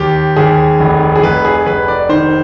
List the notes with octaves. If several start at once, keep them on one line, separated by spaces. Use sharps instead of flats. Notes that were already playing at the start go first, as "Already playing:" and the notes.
Already playing: D#2 G4
D#2 G#4
F1
G#4
F1 B4
G#4
F1 B4
D5
D#3 C5